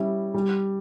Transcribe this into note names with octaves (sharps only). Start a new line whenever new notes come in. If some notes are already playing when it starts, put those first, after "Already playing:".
Already playing: G3 C#4 E4
G3